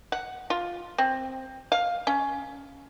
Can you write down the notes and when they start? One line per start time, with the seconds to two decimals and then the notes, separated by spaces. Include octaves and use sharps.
0.12 F#5
0.50 F4
0.98 C4
1.72 F5
2.07 C#4